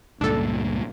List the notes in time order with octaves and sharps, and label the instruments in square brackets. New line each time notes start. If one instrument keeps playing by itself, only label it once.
[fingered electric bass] C#2 G2 A#2 [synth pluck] D4 A4